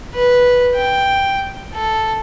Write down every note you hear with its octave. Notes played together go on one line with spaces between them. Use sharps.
B4
G5
A4